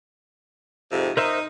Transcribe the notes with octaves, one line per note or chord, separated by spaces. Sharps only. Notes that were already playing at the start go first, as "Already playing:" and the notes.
F2 G#2 C3
D#4 A#4 C5 E5